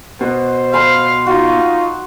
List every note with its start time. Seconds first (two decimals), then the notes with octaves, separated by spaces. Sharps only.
0.21 B2 C5
0.74 F5 B5 C6
1.27 D#4 F4 F#4